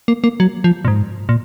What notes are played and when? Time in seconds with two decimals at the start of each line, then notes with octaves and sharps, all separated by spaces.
0.08 A#3
0.24 A#3
0.40 F#3
0.64 F3
0.85 A#2
0.88 G#2
1.29 A#2